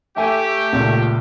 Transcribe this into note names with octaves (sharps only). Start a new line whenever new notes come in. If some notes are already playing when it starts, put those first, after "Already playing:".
A3 G4 E5 G#5
C#2 A#2